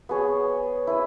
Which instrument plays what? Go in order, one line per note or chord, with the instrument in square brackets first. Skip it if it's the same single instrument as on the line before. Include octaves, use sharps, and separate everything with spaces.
[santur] B3 G#4 C#5
E4 B4